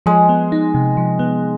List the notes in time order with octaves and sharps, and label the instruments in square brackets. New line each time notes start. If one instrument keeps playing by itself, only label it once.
[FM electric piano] F3 [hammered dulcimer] G#3
[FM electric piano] B3
D#4
C3
F3
B3